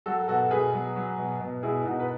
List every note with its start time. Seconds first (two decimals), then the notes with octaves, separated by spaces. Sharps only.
0.06 F#3 F#4 A4
0.28 B2 F#4 A4
0.51 B2 G#4 B4
0.74 F#3
0.96 F#3
1.18 B2
1.41 B2
1.63 B2 E4 G#4
1.85 B2 D#4 F#4
2.00 B4